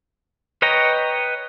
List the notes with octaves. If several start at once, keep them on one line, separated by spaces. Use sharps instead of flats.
B4 C#5 D#5 G5 A#5